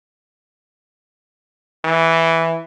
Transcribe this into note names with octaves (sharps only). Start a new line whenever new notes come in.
E3